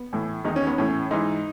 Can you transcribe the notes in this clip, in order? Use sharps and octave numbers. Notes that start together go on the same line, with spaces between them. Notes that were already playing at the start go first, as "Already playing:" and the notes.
Already playing: B3
A2 E3
E2 D#3 D#4
C#4
B3
A2 E3 C#4
G#2 E3 D#4